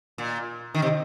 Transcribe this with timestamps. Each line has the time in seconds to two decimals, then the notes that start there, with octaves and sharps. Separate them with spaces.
0.18 A#2
0.74 D#3
0.82 C3